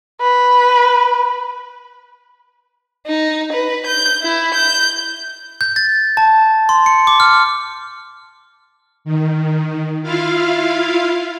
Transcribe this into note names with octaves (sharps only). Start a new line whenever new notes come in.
B4
D#4
B4
G6
E4
G6
G6
A6
A5
C6
C#7
D6
F6
D#3
E4 F4 F5